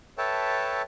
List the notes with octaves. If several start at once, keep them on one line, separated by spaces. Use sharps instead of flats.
A4 B4 C#5 E5 G5 A5